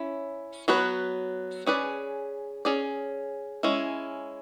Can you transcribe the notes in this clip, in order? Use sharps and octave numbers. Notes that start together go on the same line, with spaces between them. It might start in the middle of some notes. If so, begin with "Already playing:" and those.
Already playing: C#4 E4
F#3 B3 F#4 B4
C#4 G#4 B4 D5
C#4 G#4 D5
G#3 C#4 E4